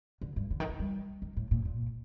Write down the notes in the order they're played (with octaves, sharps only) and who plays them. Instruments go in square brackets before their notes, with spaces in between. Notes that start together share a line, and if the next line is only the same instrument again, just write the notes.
[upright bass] D3
G2
D3
D#3
D3
G3
D#3
A2
A#2
A#2